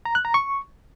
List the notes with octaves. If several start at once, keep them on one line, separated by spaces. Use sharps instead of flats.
A#5
F#6
A#5
C#6